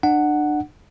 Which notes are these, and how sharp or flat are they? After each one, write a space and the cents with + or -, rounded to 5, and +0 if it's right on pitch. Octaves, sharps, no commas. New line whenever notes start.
D4 +30 F#5 +0